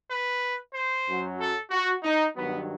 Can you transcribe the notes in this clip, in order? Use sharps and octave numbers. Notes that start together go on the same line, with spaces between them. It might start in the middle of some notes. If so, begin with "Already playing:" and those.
B4
C5
F#2 F#3
A4
F#4
D#4
G2 D#3 F#3 B3